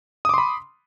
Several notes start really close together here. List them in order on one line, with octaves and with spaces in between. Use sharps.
D#6 D6 C6 B5